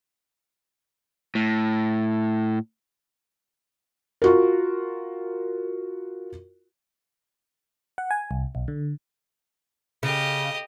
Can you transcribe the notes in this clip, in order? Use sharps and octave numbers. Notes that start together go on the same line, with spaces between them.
A2
F4 F#4 A#4
F#5
G#5
C2
B1
D3
C#3 G4 D#5